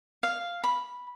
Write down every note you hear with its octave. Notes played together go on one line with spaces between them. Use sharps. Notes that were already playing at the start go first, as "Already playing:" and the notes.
F5
B5